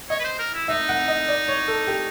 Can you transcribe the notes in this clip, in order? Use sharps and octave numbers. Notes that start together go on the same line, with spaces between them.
C#5 D#5
B4
C5
A#4
E4
D#4 E5
F#5
D#5
D5
C#5
A4
G4